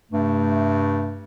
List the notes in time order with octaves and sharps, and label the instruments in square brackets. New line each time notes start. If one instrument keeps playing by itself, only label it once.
[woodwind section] G2 C3 A3